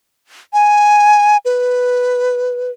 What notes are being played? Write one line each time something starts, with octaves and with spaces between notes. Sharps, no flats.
G#5
B4